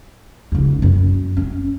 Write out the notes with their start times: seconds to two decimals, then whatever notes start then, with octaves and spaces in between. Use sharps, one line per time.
0.52 C#2 D#4
0.82 F#2
1.37 C#4